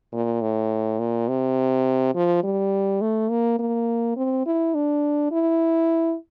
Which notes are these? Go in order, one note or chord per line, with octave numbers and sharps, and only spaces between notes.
A#2
A2
A#2
C3
F3
G3
A3
A#3
A#3
C4
E4
D4
E4